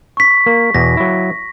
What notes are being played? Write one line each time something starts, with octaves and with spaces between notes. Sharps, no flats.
C#6 B6
A#3
E2 B2 A#6
F#3 E4